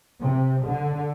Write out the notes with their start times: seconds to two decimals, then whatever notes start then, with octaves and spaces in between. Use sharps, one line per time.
0.22 C3
0.65 D3